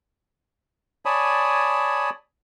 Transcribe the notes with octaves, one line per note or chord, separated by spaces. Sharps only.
C#5 D5 G#5 A5 B5 D#6